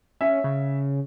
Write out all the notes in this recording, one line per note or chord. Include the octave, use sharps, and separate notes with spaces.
C#4 E5
C#3